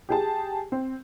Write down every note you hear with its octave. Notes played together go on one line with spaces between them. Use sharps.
G4 G#4 A5
C4